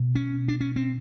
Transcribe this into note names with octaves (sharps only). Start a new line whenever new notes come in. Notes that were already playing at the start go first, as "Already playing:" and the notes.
Already playing: B2
C#4
D4
C#4
C4